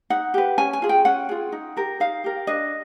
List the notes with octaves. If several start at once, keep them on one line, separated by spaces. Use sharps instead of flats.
D#4 F#5
G4 B4
C#4 G#5
G#5
F4 G#4
G5
C#4 F#5
F4 G#4
D#4
G4 A#4
D#4 F5
G4 A#4
D4 D#5